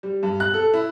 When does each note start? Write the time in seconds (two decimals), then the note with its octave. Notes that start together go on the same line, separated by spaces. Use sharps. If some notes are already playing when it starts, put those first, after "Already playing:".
0.03 G3
0.23 G2
0.40 F#6
0.54 A4
0.74 E4